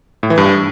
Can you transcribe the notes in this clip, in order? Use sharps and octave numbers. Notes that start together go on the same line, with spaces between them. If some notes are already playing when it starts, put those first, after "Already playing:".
A2
E3
G2